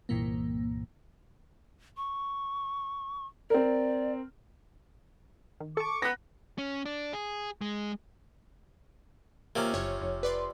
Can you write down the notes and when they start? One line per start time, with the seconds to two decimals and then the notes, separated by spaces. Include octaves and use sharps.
0.09 C2 G2 A#2 E3 A#3
1.97 C#6
3.50 C4 A#4 D5
5.60 D#3
5.77 A4 A5 C#6 D6
6.02 B3 F#6 A#6
6.58 C#4
6.86 D4
7.13 G#4
7.61 G#3
9.56 C3 F3 A#3 C#4
9.74 F#1 C#5
10.01 F1
10.23 B4 D5 C6